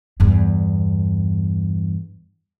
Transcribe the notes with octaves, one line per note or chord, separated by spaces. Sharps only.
E2 G2